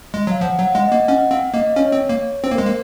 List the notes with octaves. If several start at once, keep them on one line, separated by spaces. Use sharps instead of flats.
G#3
F#3 F5
F3 F#5
F#3
F#5
G#3
D#5
A#3
C#4 F#5
C4 F5
A#3 D#5
C#4 C#5
C4
A#3
C4 C5
A#3
G#3 A#4
A#3